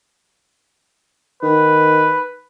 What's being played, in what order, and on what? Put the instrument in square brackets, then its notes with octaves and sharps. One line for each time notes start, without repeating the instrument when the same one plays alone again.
[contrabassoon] D#3 [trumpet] B4